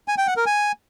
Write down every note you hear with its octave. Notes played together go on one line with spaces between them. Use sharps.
G#5
G5
F#5
A#4
G#5